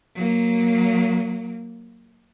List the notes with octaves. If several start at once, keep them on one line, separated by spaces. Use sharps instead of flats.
F#3 A#3